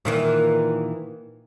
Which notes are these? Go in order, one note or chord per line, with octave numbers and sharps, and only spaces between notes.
A#2 D#3 E3